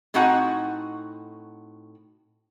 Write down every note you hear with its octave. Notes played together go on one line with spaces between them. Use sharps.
A2 C4 D#4 F#4 F#5 G#5